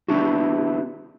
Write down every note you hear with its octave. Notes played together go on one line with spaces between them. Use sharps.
B3 C#4 D4 E4 F#4